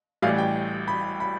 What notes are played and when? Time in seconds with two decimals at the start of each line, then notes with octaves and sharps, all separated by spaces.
0.22 A1 A2 E3 G3 F5
0.38 G5
0.88 B5
1.20 B5